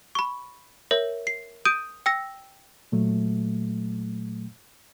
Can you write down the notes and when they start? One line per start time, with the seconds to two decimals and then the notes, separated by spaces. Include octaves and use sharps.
0.15 B5 C#6
0.91 A#4 C#5 E5
1.27 C7
1.65 D#6 G6 D7 D#7
2.06 G5 E6 A#6
2.92 A#2 F#3 A3